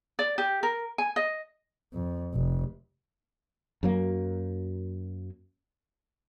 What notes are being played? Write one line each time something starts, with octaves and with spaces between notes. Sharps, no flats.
D5
G4
A#4
G#5
D#5
F2
F1
F#2 F#3 A#3